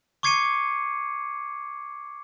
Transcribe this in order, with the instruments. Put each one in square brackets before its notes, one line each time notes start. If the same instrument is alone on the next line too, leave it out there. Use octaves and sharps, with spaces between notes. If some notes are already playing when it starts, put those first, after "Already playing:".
[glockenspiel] C#6 D6 G#6 C7 C#7 D#7